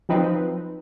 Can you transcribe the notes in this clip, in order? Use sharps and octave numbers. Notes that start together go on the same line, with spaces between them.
F3 F#3 C4 D#4 B4